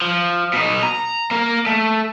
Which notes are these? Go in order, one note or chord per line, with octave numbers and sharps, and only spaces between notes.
F3
B2 D#4
A#5
A#3 A#4
A3